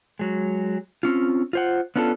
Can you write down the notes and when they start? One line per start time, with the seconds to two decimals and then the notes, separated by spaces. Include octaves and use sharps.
0.19 F#3 G#3
1.03 C4 C#4 F4
1.53 F4 C5 F#5
1.96 B3 C#4 D4 F4 A4